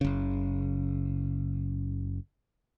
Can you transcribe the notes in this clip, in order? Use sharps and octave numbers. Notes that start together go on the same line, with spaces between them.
F#1 C#3